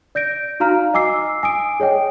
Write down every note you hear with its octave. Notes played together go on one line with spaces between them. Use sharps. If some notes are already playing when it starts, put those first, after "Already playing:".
D5 G6 A#6 D7
D#4 F#4 F5 A#5 F6
D#5 G#5 D6 E6 C7
G#5 D#6 D7
G#4 C#5 D#5 G5